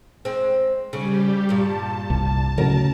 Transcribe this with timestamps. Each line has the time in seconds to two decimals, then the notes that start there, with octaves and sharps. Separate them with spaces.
0.25 G#3 C4
0.93 C#3 G3 G4
1.49 G2 A#2 A5
2.10 C2
2.58 D2 A2 C#3 F#3 A#4